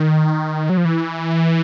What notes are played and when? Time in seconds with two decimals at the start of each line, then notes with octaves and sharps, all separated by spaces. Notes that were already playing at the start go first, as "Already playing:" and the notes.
Already playing: D#3
0.70 F#3
0.77 F3
0.85 E3